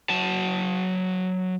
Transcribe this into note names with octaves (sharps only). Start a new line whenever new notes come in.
F#3 A5